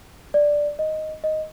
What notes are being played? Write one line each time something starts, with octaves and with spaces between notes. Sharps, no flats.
D5
D#5
D#5